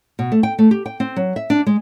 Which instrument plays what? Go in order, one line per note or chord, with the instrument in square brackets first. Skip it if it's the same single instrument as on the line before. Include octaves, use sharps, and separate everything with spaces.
[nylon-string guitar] B2
A3
G5
A3
G4
G5
C4
F#3
E5
D4
G#3